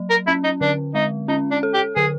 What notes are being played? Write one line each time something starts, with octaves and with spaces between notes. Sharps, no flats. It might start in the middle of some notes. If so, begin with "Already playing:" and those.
Already playing: F#3
A#4
C#4 E4
D#4
D3 D4
G#3 D#4
C#4 D#4
D4
A4
G4
D3 G#4